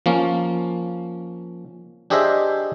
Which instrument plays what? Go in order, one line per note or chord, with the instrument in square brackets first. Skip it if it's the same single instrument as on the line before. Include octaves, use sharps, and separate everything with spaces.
[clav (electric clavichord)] F3 A#3 C#4
D4 G4 G#4 C5 D#5 E5